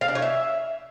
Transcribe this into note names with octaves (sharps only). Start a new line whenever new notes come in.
F5
D4
C#5
E5